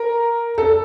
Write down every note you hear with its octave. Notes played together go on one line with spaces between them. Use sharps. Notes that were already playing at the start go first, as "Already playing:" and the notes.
Already playing: A#4
A4